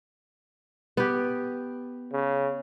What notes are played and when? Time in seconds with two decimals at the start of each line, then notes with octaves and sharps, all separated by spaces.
0.97 B3 G4
2.13 C#3